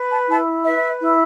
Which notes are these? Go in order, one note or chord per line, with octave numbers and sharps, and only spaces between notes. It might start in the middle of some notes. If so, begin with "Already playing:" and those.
Already playing: B4
A5
E4 A5
B4 E5
E4